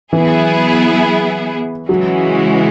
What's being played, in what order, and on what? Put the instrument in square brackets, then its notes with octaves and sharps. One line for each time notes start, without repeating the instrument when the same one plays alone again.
[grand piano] E3 [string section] F#3 B3 E4 G#4
[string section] C#3 E3 G#3 C#4 F#4 [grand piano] F#3